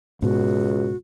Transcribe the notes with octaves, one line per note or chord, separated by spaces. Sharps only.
C#2 G#2 B2 F#4